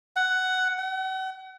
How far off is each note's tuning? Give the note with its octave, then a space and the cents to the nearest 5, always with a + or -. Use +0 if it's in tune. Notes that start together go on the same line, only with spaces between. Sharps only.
F#5 +10
F#5 +40